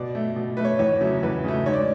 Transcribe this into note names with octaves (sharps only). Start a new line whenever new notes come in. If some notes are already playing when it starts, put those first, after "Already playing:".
Already playing: B2 D5
A3
B2
A3 B4
C#5
E2 C#5
C#3 F#3 A3
E2 B4
C#3 F#3 A3
G#2 C#5
D5